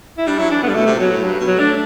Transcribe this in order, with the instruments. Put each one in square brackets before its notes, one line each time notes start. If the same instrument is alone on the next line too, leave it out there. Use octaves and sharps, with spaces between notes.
[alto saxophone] E4
[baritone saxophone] G3 [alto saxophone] D4
[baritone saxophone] F#3 [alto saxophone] E4
[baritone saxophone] E3 [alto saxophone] D4
[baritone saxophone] D3 [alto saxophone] B3
[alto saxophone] G3
[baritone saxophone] B2 [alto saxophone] A3
[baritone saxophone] C3
[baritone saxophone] B2 [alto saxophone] F#3
[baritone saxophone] A2
[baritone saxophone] G2 [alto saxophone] F#3
[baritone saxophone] B2
[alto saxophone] F#3
[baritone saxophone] A3 [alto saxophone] D4